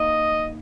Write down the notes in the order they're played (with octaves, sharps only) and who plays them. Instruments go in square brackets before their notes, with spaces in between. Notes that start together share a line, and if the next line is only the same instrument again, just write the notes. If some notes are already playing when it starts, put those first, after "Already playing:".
Already playing: [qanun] A#3 D#4 [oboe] D#5